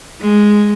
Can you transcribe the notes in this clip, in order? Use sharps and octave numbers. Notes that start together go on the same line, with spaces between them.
G#3